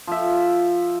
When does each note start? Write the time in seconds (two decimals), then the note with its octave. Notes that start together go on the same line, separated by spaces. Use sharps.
0.07 F3 E5